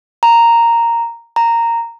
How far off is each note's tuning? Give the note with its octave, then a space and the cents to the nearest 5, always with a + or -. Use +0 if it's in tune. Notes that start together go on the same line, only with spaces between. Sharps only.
A#5 -5
A#5 -10